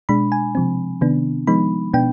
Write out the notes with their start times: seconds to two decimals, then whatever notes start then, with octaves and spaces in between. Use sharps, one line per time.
0.09 B2 G#3 D4 B5
0.32 G#5
0.55 C3 F3 C4
1.01 C3 D#3 B3 D4
1.47 F3 G#3 B3 D#4 B5
1.94 B2 B3 D4 G5